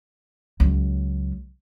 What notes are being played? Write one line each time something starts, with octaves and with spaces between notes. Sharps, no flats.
C#2 F#3